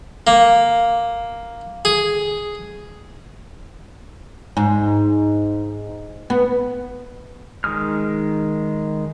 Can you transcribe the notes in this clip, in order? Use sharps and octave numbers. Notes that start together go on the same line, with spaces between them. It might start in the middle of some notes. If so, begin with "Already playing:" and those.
A#3
G#4
G#2
B3
D#3 G#3 D#6 F6